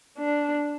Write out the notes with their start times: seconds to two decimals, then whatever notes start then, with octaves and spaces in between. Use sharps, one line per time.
0.18 D4